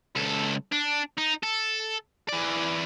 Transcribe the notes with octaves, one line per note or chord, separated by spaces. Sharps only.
C#2 A4
D4
D#4
A4
E3 D5